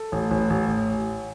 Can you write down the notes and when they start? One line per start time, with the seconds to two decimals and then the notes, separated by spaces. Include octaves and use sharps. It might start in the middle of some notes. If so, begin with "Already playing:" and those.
Already playing: A4
0.12 A1
0.31 A1
0.50 A1